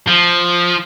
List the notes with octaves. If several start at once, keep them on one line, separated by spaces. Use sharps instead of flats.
F3